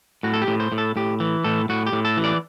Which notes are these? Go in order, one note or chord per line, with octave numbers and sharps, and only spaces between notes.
A2 F#4
A4
G4
A2
C5
A2
A4
A2 G4
E3
A2 A4
A2 F#4
G4
A2
A4
E3
D5